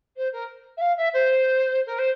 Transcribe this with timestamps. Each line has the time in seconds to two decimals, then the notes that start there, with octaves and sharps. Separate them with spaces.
0.17 C5
0.32 A#4
0.77 E5
0.81 F5
0.97 E5
1.13 C5
1.86 A#4
1.98 C5